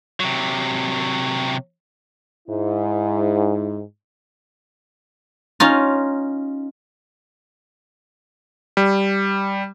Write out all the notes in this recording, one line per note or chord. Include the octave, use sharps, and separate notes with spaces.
C3 F#3
G#2 E4
C#4 D#4 F4
G3